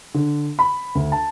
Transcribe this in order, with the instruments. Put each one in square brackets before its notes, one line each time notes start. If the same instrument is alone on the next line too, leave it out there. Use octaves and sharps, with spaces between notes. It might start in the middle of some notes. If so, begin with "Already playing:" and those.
[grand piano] D3
B5
D2
A5